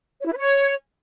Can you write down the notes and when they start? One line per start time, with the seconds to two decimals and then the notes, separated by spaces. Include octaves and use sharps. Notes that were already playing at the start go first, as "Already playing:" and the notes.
0.21 C#5
0.27 E4
0.32 B4
0.37 C#5